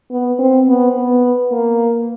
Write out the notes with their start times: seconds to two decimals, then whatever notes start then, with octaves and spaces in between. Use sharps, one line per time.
0.11 B3
0.39 C4
0.68 B3
0.95 B3
1.52 A#3